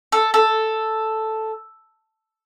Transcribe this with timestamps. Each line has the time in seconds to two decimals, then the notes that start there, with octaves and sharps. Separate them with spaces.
0.12 A4
0.34 A4